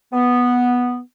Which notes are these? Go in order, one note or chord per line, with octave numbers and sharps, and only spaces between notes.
B3